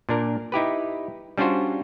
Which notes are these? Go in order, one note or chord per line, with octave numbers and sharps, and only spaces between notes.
A#2 D4 A#4
D#4 E4 G4 B4
G3 C#4 D4 F4 F#4 C5